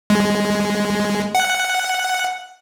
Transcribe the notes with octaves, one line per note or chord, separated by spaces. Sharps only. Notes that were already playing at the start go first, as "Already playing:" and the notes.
G#3
F#5